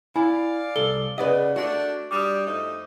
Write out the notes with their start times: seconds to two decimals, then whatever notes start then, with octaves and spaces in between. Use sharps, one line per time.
0.16 E4 D5 F5 G#5
0.76 C2 A4 G7
1.18 C#3 B4 D5 D#5 F#5
1.56 A3 D4 F#4
2.11 G3 D4 D6 D#6
2.45 F2 A3 D#4